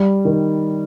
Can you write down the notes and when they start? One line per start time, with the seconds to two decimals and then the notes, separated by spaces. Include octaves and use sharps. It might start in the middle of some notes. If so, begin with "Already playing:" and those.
Already playing: G3
0.25 D#3